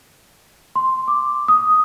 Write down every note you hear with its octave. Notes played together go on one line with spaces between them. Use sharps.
C6
D6
D#6